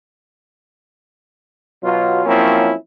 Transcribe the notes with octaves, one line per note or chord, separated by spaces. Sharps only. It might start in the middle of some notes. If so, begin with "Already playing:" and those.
B2 F#3 F4
F3 F#3 A#3 C4 C#4 E4